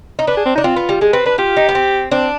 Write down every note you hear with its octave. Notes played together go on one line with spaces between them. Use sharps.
D#4
D4 B4
G#4
C4
D4 D#4
C4 F4
B3
G3
G#3 G#4
C4 B4
D4 B4
F4 G4
D#4
B3
C4
C4 D4